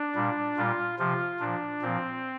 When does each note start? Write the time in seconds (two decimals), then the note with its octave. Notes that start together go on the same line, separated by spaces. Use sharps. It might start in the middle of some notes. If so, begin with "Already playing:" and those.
Already playing: D4
0.15 A#2 G3
0.57 A#2 G3 F4
0.99 C3 F3 F4
1.40 A#2 F3 D4
1.82 A#2 F3 C4